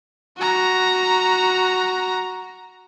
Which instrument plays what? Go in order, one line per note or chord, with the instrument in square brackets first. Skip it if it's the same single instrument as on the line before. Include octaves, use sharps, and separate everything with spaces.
[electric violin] F#4 A#5